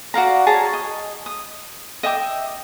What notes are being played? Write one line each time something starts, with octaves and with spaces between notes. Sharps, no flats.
F#4 D5 F5 A#5
G#4 C#5 A5 A#5
D#5
D#6
D#5 E5 G5 D6